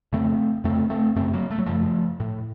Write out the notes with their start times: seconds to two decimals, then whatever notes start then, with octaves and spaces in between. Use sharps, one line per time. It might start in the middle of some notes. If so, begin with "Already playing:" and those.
0.13 F2 C#3 A3 C4
0.64 F2 C#3 A3 C4
0.90 A3 C4
1.16 F#2 C#3 A3 C4
1.33 F#3 A#3
1.51 A3
1.59 F#3
1.66 F#2 C#3 F3 A3
2.20 A2